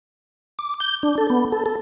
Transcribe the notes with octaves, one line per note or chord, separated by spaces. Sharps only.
D6
G6
D4
A4
B3
A4
A4